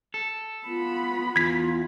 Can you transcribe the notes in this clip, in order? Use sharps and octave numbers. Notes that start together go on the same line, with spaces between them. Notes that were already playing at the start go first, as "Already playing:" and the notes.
A4
B3 F4 B5
E2 F4 G#6 B6